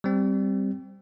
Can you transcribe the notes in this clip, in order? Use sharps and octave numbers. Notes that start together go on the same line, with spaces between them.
G3 C4